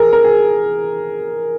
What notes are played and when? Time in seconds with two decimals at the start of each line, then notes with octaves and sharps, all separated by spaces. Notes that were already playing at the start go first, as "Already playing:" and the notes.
Already playing: G#4 A#4
0.13 A#4
0.24 G#4